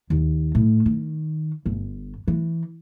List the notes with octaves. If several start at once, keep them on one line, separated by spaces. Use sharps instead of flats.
D#2
A2
D#3
G1
E3